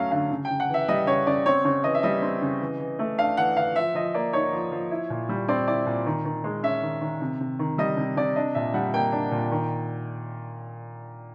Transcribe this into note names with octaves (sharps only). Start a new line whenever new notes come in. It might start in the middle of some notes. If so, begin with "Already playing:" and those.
Already playing: F#3 A3 C#4 F5
D3 F5
C#3
G5
C#3
F#5
E3 E5
G3 D#5
C#3 C#5
C#3 D5
C4 C#5
C#3 C#5
E3 D#5
E5
G3 D#5
C4
C#3
E3
E3
A3
D4 F5
E3 F#5
E3 F5
F3 E5
F3 D#5
A#3 D5
D#4 C#5
F3
F3
E4
A#2
G3
C4 D5
E4 D5
A#2
D#3
D#3
G#3
C#4 E5
D#3
D#3
C3
C3
D#3
G3 D#5
C3
C3 D5
D4 D#5
A#2 E5
G3 F#5
A#3 G5
D4
A#2
D#3